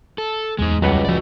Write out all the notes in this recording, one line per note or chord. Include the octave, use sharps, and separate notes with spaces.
A4
D1 E2 G#3 D#4
C#2 F#3 G3 B4 F#5
F#1 F3 F#4 D5